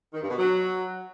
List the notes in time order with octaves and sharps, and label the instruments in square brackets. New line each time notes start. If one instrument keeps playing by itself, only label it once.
[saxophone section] D#3
G2
B2
F#3